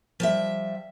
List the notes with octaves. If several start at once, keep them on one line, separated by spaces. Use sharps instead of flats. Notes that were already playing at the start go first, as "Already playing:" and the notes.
F3 G3 E5